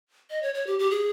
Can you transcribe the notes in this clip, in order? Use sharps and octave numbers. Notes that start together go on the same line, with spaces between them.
D#5
C#5
C#5
G4
G4
G#4